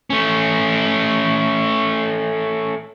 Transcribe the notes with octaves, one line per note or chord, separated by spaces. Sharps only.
A3 C#4